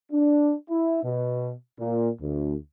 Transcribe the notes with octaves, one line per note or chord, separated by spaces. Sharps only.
D4
E4
B2
A#2
D2